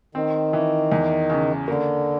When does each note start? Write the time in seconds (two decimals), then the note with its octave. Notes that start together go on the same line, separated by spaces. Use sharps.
0.15 D#3 C4
0.53 E3
0.92 E2
1.30 C#3
1.68 D3 A#3